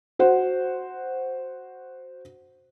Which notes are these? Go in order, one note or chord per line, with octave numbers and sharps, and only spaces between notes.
F#4 C5 F#5